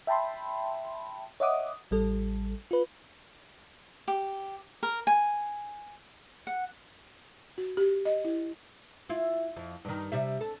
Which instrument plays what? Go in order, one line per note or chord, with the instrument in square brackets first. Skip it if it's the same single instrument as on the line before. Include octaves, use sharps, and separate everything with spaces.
[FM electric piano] E5 G5 A5 B5 C6
C#5 D#5 E5 F#5 D6 D#6
A1 G3 A4
F4 B4
[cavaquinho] G4
A#4
G#5
F#5
[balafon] F#4
G4
D#5
E4
[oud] E4 F4
F2
G2 D#3
C3 G3 E5
A4